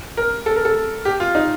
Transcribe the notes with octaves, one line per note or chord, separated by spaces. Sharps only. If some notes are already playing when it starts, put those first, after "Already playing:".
A#4
A4
A#4
A4
G4
F4
D#4